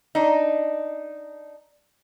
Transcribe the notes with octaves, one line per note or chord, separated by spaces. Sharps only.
D4 D#4